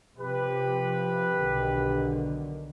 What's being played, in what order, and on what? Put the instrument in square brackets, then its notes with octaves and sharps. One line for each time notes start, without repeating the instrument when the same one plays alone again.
[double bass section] C3 F3 [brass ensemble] G4 B4
[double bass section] B1 D3 D#3